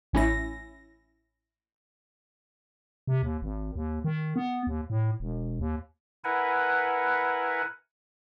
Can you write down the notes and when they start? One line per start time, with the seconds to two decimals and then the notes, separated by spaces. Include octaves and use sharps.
0.13 A1 C#4 E4 A#6
3.07 C3
3.23 D#2
3.42 G#1
3.76 D#2
4.04 D#3
4.36 B3
4.67 D#2
4.90 A2
5.20 E1
5.59 D#2
6.24 E4 A#4 B4 F#5 G#5